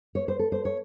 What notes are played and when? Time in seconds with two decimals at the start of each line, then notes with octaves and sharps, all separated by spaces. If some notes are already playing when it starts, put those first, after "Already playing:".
0.15 C#5
0.28 C5
0.39 A4
0.52 C5
0.65 C#5